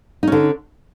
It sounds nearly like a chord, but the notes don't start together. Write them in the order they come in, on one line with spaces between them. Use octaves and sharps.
D#4 C#4 D3